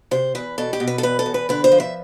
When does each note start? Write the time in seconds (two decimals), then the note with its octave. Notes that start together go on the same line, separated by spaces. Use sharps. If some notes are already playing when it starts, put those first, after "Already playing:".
0.11 C3 C5
0.35 E2 B4
0.58 B2 A4
0.73 G4
0.80 B2
0.87 B4
0.98 A4
1.03 E2 B4
1.19 A4
1.26 E2
1.34 B4
1.49 D3 B4
1.64 C5
1.72 F3
1.80 E5